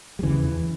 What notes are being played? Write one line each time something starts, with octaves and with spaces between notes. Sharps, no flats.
G3
E2 C#3 E3